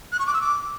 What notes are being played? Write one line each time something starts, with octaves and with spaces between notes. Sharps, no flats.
F#6
C#6
D6
E6
D6